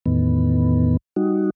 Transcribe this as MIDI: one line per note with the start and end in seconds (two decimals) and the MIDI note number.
0.06 0.97 40
0.06 0.97 45
0.06 0.97 51
0.06 0.97 59
1.16 1.50 55
1.16 1.50 63
1.16 1.50 66